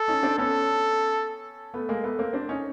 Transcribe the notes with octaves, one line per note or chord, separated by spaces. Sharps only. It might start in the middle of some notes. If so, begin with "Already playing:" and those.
Already playing: A4
C#4 D#4
C4 D4
B3 C#4 A4
A3 B3
G#3 A#3
A3 B3
A#3 C4
C4 D4
C#4 D#4